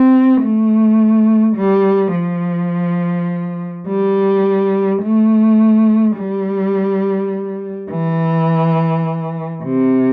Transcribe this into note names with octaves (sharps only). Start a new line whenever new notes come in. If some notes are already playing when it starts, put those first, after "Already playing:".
Already playing: C4
A3
G3
F3
G3
A3
G3
E3
C3